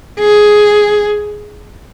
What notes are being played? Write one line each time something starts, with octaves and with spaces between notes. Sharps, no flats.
G#4